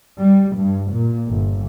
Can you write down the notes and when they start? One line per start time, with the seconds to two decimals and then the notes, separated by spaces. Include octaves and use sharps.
0.17 G3
0.56 G2
0.90 A#2
1.28 G1